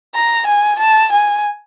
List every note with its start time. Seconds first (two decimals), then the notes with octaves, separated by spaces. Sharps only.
0.15 A#5
0.47 G#5
0.79 A5
1.12 G#5